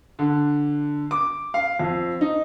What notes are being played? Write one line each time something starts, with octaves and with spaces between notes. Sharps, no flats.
D3
D6
F5
F2
D#4